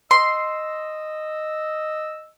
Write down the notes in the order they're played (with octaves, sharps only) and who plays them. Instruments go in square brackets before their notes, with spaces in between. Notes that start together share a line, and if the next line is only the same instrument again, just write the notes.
[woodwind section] D#5 E6 [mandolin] C6